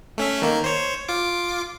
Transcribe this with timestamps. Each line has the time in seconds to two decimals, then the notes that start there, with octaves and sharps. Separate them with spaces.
0.18 A3 C#4 E5
0.42 D#3 A#3
0.64 C5 C#5
1.08 F4 D6